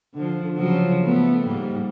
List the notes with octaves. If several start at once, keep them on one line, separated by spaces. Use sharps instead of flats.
D3 F3
C#3 F3 F#3
A3 B3
G#2 G3 A#3